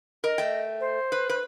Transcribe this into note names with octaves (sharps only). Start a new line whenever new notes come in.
A#4 D#5
A3 G5
C5
B4
B4